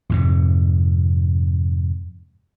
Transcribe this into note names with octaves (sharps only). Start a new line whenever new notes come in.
F2 G#2 C3